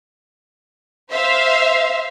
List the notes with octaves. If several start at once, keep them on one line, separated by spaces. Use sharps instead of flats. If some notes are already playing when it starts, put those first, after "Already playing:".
C5 E5 F5